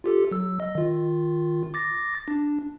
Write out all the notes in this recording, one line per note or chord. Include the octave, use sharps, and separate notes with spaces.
F4 G4 A4
F#3 E6
D#5
D#3 F4
D6 A6 A#6
D4